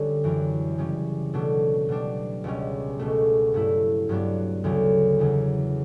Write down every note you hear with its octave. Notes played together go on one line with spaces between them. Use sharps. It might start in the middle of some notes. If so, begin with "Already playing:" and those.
Already playing: D3 G3 C#4
F#2 E3 G3
C#3 G3 C#4
B2 F#3 A3 D4
B2 G3 D4
C#2 B2 G3 C#4
C#2 B2 A3
G2 F#3 A3 E4
G2 F#3 B3 D4
D2 C#3 F#3
E2 C#3 F#3